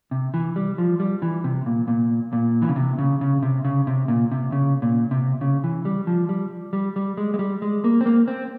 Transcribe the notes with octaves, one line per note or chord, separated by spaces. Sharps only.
C3
E3
G3
F3
G3
E3
C3
A#2
A#2
A#2
E3
C#3
C3
C#3
C#3
C3
C#3
C3
A#2
C3
C#3
A#2
C3
C#3
E3
G3
F3
G3
G3
G3
G#3
G#3
G3
G#3
A#3
C4
A#3
C4